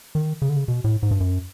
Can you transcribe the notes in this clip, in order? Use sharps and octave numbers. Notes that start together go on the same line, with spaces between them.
D#3
C#3
D3
C#3
B2
A2
G#2
G2
F#2